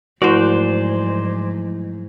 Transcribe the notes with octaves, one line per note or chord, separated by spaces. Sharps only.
G#2 F3 F#3 A3 E4 F#4 C5 D5